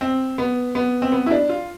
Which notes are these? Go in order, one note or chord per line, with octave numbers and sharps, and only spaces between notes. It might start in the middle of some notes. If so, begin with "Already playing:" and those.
C4
B3
B3
C4
B3
E4
D4
F4